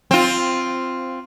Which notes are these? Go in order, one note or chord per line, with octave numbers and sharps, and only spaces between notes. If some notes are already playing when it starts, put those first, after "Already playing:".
C4 F4